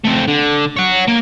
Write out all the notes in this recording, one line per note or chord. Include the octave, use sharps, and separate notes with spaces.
A3 C4
D3
C#5 F#5
A#3